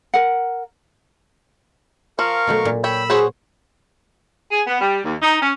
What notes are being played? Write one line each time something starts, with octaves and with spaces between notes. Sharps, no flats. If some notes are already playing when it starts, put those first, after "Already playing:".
A#4 F#5
F3 A#4 F5 C#6
B2 F#3 A3
A#2
C#5 G5 B5 E6
F#4 G#4 C5 C#5
G#4
B3
G3
D#2
D#4
C#4